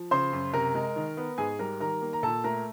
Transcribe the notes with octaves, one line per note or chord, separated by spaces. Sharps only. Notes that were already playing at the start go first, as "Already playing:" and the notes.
Already playing: F3
C#3 C5 C6
F#2
C3 A#4 A#5
G#3
D#3
B3
G#2 G#4 G#5
G3 A#4 A#5
D#3 A#4 A#5
A#3
A#5
A#2 A4 A5
A3 A#4 A#5